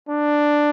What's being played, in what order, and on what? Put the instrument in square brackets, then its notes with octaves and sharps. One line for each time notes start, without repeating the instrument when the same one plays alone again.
[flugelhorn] D4